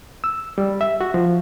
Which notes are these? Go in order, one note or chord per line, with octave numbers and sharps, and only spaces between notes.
E6
G3
E5
F#4
F3